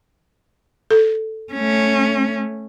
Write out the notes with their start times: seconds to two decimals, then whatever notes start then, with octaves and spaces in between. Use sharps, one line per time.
0.91 A4
1.53 A3 C#4